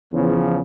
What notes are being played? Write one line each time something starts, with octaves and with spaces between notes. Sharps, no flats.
E2 C#3 F3